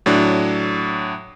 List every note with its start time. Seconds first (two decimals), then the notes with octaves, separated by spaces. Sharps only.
0.06 A2 F#3 D4